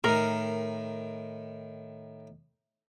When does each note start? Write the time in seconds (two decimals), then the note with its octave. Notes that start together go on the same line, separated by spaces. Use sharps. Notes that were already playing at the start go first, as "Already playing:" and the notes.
0.04 A2 D#3 A#4